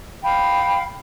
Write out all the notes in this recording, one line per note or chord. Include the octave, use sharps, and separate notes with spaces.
F5 G5 B5